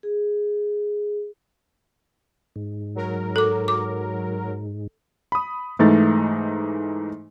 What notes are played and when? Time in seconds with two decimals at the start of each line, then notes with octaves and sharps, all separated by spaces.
0.03 G#4
2.56 G#2
2.95 F#3 A#4
3.36 A4 D6
3.68 D6
5.32 B5 D#6
5.79 G#2 E3 A3 D#4 A6